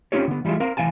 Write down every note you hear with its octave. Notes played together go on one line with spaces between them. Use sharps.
C4 C#4 D#4 F4 G4 C#5
D3 B3
E3 G3 G#3 F4 E5
C4 A#4 F5
C2 E3 F5 G#5 A5